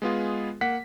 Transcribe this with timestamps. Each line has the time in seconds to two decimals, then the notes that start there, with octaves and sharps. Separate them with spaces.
0.02 G#3 B3 F4 G#4
0.61 A#3 F#5 B6